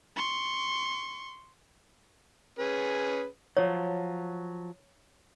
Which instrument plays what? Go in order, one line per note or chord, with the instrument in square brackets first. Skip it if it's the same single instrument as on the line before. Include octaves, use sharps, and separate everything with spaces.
[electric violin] C6 C#6
[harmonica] C#4 G#4 B4
[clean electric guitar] F3 F#3 [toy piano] C#5